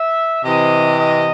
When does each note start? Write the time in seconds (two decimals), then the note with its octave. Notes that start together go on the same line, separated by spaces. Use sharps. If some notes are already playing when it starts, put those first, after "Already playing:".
Already playing: E5
0.44 C3 E3 D#5
0.99 D#5